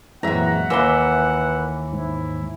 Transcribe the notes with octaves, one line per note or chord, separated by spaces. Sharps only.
F#2 A#2 E3 G#3 C4 E5 F#5 A#5
D#2 E3 A#4 B4 D#5 C6 E6
G#2 E4